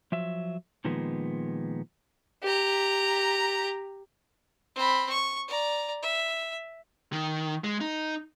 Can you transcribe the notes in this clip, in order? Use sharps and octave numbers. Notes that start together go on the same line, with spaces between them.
F3 F#3 E5
A#2 D#3 F3 G#3 B3
G4 A#5
C4 B5
C#6
D5 A#5
E5
D#3
G#3
D#4